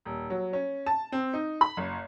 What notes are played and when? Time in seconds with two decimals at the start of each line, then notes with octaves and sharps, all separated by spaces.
0.05 D#1
0.30 F#3
0.53 C#4
0.86 A5
1.12 C4
1.33 D#4
1.61 B5
1.77 F#1